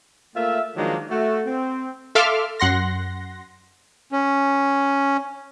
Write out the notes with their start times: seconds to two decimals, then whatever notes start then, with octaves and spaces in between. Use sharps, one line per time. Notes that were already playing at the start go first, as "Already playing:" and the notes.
0.36 A3 A#3 F4 E5
0.76 D#3 F3 F#3 G#3 A#3 D4
1.10 A3 F#4
1.46 C4
2.15 A4 E5 F5 C6 D6 F6
2.60 F#2 F#5 C6 A#6
4.12 C#4